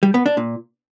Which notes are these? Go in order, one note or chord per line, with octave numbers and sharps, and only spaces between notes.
G3
B3
D4
A#2